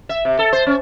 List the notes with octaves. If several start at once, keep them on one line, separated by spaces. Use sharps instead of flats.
E5
C3
A4
C5
C#4